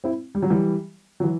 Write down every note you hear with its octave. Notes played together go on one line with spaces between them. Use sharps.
C4 E4
G3
F#3
E3 G3
F#3
E3